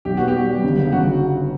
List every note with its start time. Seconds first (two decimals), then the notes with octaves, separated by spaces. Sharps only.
0.05 B1 G4
0.17 B3 F#4
0.28 G4
0.34 G3
0.49 G3
0.64 G1
0.78 C#3
0.92 G1 F#4